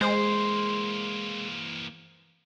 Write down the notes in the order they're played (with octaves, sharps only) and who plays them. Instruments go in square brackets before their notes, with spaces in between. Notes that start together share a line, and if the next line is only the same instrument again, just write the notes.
[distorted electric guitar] E3 A#3 [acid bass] G#3 [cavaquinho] C5